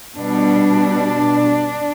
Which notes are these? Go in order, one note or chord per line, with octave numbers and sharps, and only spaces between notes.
B2 G3 D4